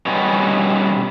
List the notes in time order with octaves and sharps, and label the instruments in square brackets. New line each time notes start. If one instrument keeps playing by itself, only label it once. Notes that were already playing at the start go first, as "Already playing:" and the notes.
[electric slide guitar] B2 G3 B3 C#4 D#4